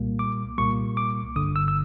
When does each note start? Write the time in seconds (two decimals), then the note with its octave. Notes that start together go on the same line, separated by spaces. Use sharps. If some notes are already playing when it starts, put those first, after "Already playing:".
Already playing: C2 A#2 G3 A#3
0.19 D6
0.58 C2 A#2 G3 A#3 C#6
0.97 D6
1.36 G1 G2 D3 D#6
1.56 E6
1.68 E6